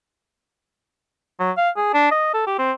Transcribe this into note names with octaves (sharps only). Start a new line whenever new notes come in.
F#3
F5
G#4
D4
D#5
A4
G4
C4